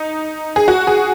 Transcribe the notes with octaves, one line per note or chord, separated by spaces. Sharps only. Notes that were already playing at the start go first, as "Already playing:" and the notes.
Already playing: D#4
G#4
F#4
G#4